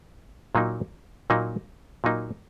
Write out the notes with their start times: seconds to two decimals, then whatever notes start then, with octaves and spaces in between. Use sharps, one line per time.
0.55 A#2 F#3 A#3 D#4
1.30 A#2 F#3 A#3 D#4
2.04 A#2 F#3 A#3 D#4